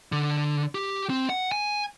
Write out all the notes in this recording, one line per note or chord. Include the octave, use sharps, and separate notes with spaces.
D3
G4
C4
F#5
G#5